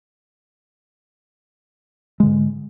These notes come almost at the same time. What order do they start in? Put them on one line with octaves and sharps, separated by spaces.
G#3 D3 G#2